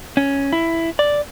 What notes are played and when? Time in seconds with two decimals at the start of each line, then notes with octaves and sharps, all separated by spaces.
0.17 C#4
0.53 E4
0.99 D5